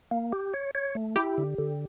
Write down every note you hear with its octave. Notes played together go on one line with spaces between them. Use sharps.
A#3
G4
C#5
C#5
A3
E4 G4
D3
D3